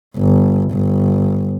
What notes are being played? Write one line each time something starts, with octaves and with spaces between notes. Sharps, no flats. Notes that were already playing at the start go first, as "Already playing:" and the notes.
G1
G1